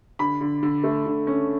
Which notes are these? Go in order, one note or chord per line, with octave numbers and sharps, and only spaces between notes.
D3 B5
D3
D3
A3
D3
C#4